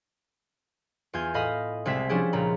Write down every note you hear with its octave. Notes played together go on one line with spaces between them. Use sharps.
E2 F4 G#5 G6
A2 D#5 F5 B5 D#6
C2 C3 G#3 C4 E5 B6
F3 C#4 D4 E4 G4 G#4
C#2 A#2 A#5 B5